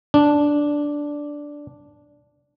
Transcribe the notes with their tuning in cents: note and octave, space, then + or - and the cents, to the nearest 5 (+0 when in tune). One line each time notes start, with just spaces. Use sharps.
D4 -5